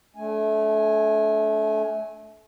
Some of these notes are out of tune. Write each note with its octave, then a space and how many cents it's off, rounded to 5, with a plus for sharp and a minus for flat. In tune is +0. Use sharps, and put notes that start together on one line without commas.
A3 -25 D4 -40 G#5 +0